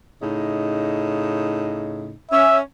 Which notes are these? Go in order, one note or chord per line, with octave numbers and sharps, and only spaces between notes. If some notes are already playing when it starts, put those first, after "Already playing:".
A2 C#3 D#4
C#4 E5